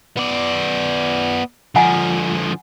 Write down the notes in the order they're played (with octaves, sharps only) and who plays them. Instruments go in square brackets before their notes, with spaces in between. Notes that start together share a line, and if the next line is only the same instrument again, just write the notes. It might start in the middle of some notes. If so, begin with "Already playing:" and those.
[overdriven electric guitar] B3 D5
[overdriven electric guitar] D3 F3 [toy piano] F#5 G#5 A#5